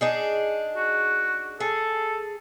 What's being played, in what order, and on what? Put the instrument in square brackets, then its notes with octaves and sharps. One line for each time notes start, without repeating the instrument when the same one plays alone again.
[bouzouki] D4 D#4 G#4
[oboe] F#4
[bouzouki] G#4 [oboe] A4